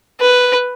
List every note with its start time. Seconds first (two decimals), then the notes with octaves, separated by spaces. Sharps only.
0.20 B4